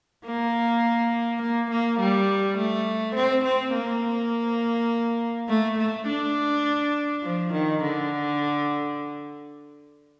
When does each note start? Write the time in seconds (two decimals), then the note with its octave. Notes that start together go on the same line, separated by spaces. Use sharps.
0.25 A#3
1.42 A#3
1.71 A#3
1.99 G3
2.57 A3
3.16 C4
3.45 C4
3.74 A#3
5.49 A3
5.78 A3
6.07 D4
7.23 F3
7.53 D#3
7.82 D3